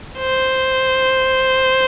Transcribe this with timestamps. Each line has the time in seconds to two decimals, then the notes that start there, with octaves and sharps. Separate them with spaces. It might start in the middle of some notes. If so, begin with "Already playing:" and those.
0.19 C5